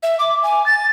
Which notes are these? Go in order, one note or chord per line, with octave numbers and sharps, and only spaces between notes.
E5
D6
G#5
A6